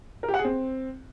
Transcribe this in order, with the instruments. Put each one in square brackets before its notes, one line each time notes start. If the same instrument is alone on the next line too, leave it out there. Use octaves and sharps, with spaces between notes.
[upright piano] A#4
G4
F#5
G#4
C4